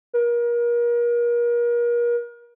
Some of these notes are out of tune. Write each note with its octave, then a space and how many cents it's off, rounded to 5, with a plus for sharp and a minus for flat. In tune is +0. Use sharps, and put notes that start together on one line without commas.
A#4 +35